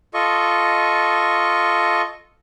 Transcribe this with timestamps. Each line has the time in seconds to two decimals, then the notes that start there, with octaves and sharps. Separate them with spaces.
0.14 F4 A4 D#5 C#6